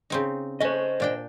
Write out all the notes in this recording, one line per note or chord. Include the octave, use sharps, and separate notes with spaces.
C#3 C4 D#4
A3 C#4 C5 D#5
A#2 D4 G5